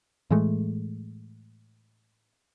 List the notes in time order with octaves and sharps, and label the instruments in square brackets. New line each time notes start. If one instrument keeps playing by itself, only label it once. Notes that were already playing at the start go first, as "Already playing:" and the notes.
[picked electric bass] A2 E3 G#3 A3